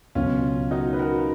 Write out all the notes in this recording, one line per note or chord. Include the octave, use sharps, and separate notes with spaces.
C#2 B2 F#3 C#4 F4
D#4 F#4
B4
F#4 A#4